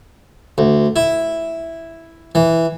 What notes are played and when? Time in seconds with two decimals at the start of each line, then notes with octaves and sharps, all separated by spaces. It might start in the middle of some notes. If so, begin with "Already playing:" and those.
0.58 D2
0.96 E4
2.35 E3